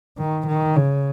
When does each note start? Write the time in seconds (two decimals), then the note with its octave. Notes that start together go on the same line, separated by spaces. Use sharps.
0.18 D#3
0.47 D#3
0.76 C#3